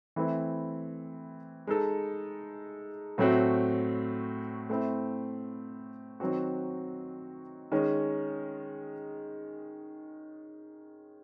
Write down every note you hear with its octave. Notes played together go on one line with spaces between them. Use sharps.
E3 A3 C4 E4
G#3 D#4 A4
A2 F#3 A3 C4 F#4
A3 C4 E4
D#3 F#3 C4 F#4
D#3 G#3 C#4